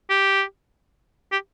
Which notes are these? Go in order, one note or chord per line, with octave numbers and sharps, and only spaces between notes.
G4
G4